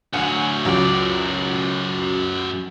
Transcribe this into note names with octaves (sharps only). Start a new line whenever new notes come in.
D2 F#3 F#5 G#5
C#2 F#2 F#3 D5